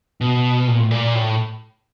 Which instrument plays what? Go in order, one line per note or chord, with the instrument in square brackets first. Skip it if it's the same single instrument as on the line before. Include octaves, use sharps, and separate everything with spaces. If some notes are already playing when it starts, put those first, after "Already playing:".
[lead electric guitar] B2
A#2
A2
A#2
A2